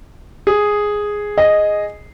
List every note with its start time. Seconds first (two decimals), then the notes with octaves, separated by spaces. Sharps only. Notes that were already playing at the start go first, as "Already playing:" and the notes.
0.47 G#4
1.38 D#5